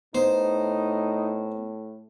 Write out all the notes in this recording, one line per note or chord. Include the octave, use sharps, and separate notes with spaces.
A2 B3 D#4 C5